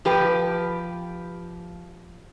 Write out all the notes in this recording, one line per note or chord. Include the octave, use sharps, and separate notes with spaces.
F3 G4 B4